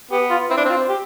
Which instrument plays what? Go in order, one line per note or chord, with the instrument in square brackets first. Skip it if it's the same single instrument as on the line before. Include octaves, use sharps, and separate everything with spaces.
[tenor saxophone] B3 [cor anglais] G4
[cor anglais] F4
[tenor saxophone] C4 [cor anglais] E4
[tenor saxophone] D4
[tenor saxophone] C4 [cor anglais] F4
[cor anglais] G4